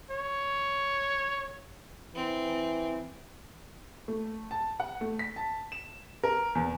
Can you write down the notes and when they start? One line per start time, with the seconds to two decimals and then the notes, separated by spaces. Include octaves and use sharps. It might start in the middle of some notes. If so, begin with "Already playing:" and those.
0.11 C#5
2.15 E3 C4
4.08 A3
4.51 A5
4.80 F#5
5.01 A3
5.19 B6
5.36 A5
5.72 E7
6.23 A#4
6.55 E2